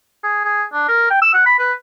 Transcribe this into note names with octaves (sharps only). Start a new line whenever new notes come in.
G#4
G#4
D4
A#4
G5
E6
F#5
B5
B4